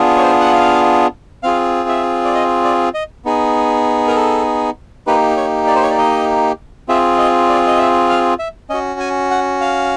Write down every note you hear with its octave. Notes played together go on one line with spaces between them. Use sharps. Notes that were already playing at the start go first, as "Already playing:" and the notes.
Already playing: B3 D4 F4 G#4
C#5
C5
F#5
F5
C4 F4 G#4 F5
E5
D5
D#5
D5
D#5
B3 D#4 G#4
A#4
A4
A#3 D#4 G4 B4
C#5
D5
C5
C#5
D5
D#5
C4 F4 G#4 E5
D#5
D5
D#5
E5
F5
E5
C#4 F#4 D#5
G#5
F#5
F5